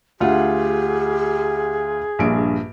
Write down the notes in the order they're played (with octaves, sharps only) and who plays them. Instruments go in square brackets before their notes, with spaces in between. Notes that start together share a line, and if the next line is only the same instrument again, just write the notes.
[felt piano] D2 F4 F#5 [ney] G4 [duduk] G#4
[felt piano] A#1 G2 D7